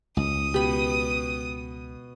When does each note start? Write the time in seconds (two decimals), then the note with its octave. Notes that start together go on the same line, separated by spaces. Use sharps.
0.17 C#2 D#6
0.54 B2 G4 B5